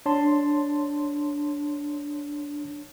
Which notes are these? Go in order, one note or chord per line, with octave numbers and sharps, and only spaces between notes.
D4 C#5 A5 C6